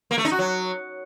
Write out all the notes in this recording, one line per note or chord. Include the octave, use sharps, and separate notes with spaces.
A#3
A3
D#4
F#4
F#3